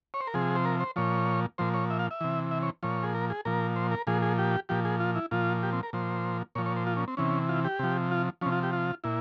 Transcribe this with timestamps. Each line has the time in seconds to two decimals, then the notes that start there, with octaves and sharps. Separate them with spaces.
0.14 C#5
0.21 C5
0.27 A#4
0.34 C3 F3 G#4
0.55 C5
0.65 A#4
0.80 C5
0.96 A#2 F3 C#5
1.58 A#2 F3 C5
1.74 C#5
1.90 E5
1.99 F5
2.11 E5
2.21 C3 E3
2.51 E5
2.62 C#5
2.83 A#2 F3 C#5
3.03 G#4
3.15 A#4
3.30 G#4
3.45 A#2 F3 A#4
3.76 C5
3.91 A#4
4.07 A#2 F3 G#4
4.22 G#4
4.38 G4
4.69 A#2 F3 G4
4.85 G#4
5.00 F4
5.15 E4
5.31 A#2 F3 F4
5.63 G4
5.73 C4
5.83 A#4
5.93 A#2 F3 C5
6.55 A#2 C#5
6.58 F3
6.66 C#5
6.76 C5
6.87 F4
6.97 C#4
7.08 C4
7.17 C3 E3 C#4
7.49 F4
7.65 G4
7.79 C3 F3
8.11 F4
8.41 F3 C#4
8.46 C3
8.52 F4
8.63 G4
8.73 F4
9.04 A#2 E4